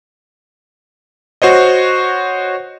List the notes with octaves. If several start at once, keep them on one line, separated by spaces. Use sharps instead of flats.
F#4 C5 C#5 D#5